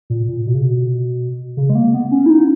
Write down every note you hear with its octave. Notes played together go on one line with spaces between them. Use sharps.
A#2
A#2
B2
C#3
B2
C#3
G#3
A#3
B3
C#4
E4
D#4